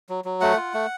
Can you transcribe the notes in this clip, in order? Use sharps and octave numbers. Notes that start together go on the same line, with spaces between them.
F#3
F#3
A3 F#5
F4
A3